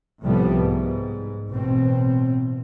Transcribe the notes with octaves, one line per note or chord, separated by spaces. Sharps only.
C2 A2 F3 G3 A3 B3
G#2
A1 B2 C4